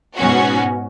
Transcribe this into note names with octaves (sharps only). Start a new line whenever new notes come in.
G#2 B2 C#4 F#4